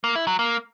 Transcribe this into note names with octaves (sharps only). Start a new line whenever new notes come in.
A#3
E4
F#3
A#3